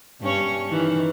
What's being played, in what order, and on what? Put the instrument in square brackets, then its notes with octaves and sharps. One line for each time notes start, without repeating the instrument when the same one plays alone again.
[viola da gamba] G2 C#4 C#5
D#3 E3